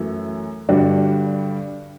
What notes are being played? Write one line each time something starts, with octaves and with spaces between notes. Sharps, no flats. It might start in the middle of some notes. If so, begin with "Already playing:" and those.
Already playing: F#2 E3 A3
G2 D3 G3 D4 F#4